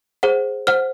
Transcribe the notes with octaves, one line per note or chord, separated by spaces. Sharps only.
G#4 C5 F#5
C5 F#5 F6